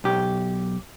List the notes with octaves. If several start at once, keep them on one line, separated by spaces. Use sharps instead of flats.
B1 G4